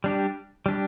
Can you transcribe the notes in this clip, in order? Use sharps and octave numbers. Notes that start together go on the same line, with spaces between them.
G3 D4 G4
G3 D4 G4